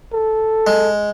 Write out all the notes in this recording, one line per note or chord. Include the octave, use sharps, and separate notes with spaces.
A4
G#3